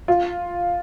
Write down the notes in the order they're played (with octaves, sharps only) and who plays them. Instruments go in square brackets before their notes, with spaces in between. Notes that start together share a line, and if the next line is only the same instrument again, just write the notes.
[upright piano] F4